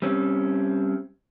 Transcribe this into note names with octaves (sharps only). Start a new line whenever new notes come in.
G3 C4 C#4